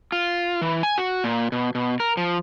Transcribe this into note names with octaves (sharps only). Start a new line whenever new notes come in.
F4
E3
G#5
F#4
A#2
B2
B2
A#4
F3